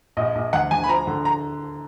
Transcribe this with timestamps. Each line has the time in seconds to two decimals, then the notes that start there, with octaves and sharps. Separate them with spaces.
0.17 A#1 D#5
0.35 A#1
0.53 D2 F#5
0.71 D2 G#5
0.84 B5
0.89 F3 A#5
1.07 D3
1.25 A#5